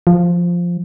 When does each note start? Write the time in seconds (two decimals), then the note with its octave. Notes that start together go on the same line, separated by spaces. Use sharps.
0.07 F3